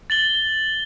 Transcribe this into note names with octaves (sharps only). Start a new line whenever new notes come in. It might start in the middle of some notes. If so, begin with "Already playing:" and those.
A6 F#7 G7